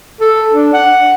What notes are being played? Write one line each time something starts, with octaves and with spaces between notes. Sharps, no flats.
A4
D4
F#5